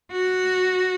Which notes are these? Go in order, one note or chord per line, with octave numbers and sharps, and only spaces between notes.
F#4